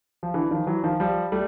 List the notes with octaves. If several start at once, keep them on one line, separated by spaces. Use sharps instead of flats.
F3
D3 E3
D#3 F3
E3 F#3
D#3 F3
F3 G3
G3 A3